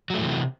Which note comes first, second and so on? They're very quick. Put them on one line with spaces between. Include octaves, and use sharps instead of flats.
F#3 A3 A2 E3 C3